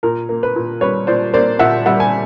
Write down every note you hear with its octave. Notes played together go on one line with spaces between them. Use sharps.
A#2 A#4
A#3
B4
A#2
G3 B4 C#5
A#2 C5 D5
A#3 C5 D5
A#2 E5 F#5
G3 E5 F#5
G#5